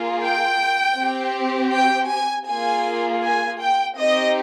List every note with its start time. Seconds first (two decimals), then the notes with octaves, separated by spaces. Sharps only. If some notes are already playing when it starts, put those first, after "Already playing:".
Already playing: A#3 F4 G#4
0.23 G5
0.97 C4 G4
1.73 G5
2.10 G#5
2.47 A#3 F4 G#4 G#5
3.24 G#5
3.61 G5
3.98 C4 D#4 G4 D#5